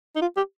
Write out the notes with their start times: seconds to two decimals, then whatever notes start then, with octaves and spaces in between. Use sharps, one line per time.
0.16 D#4
0.22 F4
0.37 G4